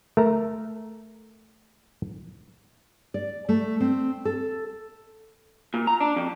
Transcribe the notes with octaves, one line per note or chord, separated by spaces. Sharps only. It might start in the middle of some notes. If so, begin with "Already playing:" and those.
A3 A#4 A#5
D5
A3
C4
A4
A#2
A#5
D4
F2